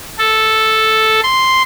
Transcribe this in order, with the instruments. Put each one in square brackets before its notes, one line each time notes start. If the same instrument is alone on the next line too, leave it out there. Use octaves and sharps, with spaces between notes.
[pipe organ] A4
C6